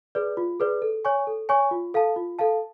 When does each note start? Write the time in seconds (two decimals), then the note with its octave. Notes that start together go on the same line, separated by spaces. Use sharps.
0.15 G#4 B4 D5
0.37 F4
0.60 G#4 B4 D5
0.82 A4
1.05 C#5 G#5 C#6
1.27 A4
1.49 C#5 G#5 C#6
1.71 F4
1.94 A4 F5 A5
2.16 F4
2.39 A4 F5 A5